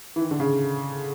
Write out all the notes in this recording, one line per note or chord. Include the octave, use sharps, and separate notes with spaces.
E3
D#3
D3
C#3